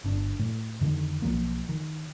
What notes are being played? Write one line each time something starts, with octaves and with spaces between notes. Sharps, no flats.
G1 D4
A2
F2 D3 D#3
B1 F#2 F3 A#3
D#3